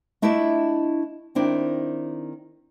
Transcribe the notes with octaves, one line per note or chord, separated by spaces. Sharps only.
A3 D4 E4 F4 D#5 E5
D#3 C4 D4 E4